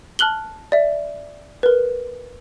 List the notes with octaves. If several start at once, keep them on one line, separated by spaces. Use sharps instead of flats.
A5 F6 F#6 F#7 G7
D5 E5
A#4 B4